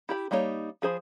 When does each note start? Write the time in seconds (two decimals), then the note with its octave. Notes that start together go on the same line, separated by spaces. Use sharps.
0.09 E4 G4 B5
0.31 G3 A#3 D#4 A#4 C#5
0.82 F3 G#4 C5 B5